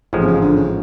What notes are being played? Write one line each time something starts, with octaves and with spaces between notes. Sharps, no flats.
A1 G#2 F3 G#3
C3
C#3
D3
C#3